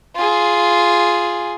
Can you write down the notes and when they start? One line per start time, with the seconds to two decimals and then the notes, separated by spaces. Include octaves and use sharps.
0.16 F4 G#4